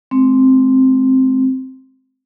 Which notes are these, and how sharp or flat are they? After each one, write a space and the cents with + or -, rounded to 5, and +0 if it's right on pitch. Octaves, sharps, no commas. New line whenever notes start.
G#3 +45 C4 +0